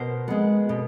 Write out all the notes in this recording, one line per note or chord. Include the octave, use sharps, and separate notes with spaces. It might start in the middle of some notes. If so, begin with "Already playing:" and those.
Already playing: B2 A#4 C5
G#3 B3
B2